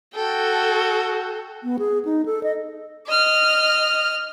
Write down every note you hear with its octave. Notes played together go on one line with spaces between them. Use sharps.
F#4 A4 G5
B3
G#4
D#4
A4
D#5
D#5 F6